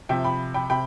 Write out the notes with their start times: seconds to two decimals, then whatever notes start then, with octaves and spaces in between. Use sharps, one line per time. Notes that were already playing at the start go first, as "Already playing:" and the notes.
0.09 C3 F3 E5 G5
0.24 G5 B5
0.54 G5 B5
0.70 C3 G5 B5